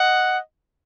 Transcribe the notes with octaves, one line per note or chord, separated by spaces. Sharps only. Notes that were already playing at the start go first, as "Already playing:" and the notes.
Already playing: D#5 F#5